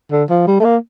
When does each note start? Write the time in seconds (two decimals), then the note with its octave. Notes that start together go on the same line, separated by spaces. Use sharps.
0.11 D3
0.30 F3
0.47 G3
0.60 A3
0.64 A#3